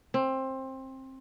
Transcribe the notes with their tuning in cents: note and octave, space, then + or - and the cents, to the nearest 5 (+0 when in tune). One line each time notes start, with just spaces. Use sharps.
C4 +20